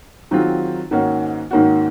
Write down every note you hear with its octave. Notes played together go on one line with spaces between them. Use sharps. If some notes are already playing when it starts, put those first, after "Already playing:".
D#3 F#3 C4 F4 G#4
G#2 D#3 A#3 C#4 F#4
G#2 D#3 A#3 C#4 F#4